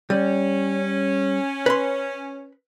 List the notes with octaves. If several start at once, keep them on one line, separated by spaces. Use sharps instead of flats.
G3 C#4
B4 C6